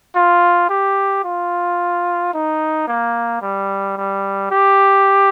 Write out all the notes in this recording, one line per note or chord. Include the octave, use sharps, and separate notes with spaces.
F4
G4
F4
D#4
A#3
G3
G3
G4